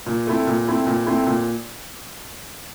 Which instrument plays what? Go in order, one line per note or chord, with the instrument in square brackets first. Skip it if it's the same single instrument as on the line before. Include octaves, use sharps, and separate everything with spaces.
[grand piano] A#2
A3 C4 E4
A#2
A3 C4 E4
A#2
A3 C4 E4
A#2